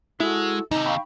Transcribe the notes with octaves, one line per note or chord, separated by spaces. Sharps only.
G#3 E4 F#4 A4 E6
D#2 C3 D#4
F5 G5 B5 C#6